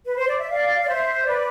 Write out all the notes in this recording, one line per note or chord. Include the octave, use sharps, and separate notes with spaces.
B4
C5
D5
E5
D5 F5
D5
C5 E5
B4 D5